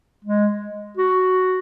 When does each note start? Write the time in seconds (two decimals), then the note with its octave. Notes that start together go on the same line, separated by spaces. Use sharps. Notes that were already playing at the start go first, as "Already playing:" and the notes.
0.25 G#3
0.97 F#4